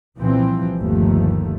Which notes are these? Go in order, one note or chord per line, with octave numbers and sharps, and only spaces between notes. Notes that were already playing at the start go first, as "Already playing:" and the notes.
C2 A#2 E3 F3 C4
G1 D#2 F3 A3